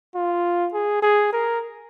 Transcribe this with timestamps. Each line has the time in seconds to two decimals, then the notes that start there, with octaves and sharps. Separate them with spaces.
0.15 F4
0.74 G#4
1.02 G#4
1.33 A#4